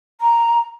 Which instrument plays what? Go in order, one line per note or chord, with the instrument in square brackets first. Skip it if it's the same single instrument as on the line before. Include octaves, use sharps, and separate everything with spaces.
[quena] A#5